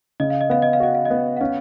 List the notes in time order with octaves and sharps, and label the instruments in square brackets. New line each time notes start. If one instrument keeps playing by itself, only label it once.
[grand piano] C#3 [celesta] D#5
[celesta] F5
D#5
[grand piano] B3 [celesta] F5
[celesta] D#5
F5
[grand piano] F#4 [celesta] D#5
[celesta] F5
D#5
[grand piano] B3
[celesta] F#5
[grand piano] C#4 [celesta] F5